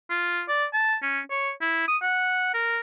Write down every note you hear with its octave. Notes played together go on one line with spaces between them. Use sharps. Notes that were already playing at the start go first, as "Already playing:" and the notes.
F4
D5
A5
C#4
C#5
E4
D#6
F#5
A#4